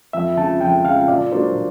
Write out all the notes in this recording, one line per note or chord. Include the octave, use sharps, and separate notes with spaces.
F2 E5
C#3 F3 A5
F2 G5
C#3 F3 F5
A#2 D5
F#3 A#3 D4 C5
A#2